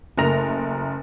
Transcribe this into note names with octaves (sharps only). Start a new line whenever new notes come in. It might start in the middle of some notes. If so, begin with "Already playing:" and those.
F#1 A3 A#4 A#6 F7